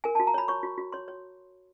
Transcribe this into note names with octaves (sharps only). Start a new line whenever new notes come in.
A#4 G#5
F#4 A5
A#5
C#5 B5
C#5 C#6
F#4
F#4
C#5 C6
C#5